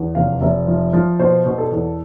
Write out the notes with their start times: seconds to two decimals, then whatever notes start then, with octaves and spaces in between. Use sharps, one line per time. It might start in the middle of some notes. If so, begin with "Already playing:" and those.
Already playing: E2
0.15 F1 F5
0.41 F1 E5
0.67 F3
0.93 F3
1.19 B2 C5
1.46 B2
1.58 A4
1.72 E2